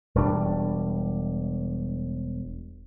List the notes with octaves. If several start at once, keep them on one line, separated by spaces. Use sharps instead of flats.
E1 G3 D4